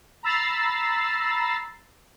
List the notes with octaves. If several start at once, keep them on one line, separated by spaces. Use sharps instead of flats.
A#5 B5 E6 A6 C7